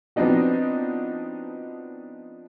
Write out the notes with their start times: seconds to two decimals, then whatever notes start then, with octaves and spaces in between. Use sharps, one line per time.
0.16 F3 B3 C4 D4 D#4 F#4